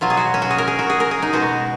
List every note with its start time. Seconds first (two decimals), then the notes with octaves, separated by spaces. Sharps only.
0.01 B2 F#3 F4
0.10 G#4
0.17 F#4
0.34 C#4
0.42 F#4
0.51 G#4
0.58 A#4
0.68 G#4
0.79 F#4
0.90 G#4
1.00 A#4
1.11 G#4
1.22 D#4
1.33 B2 G#3 F#4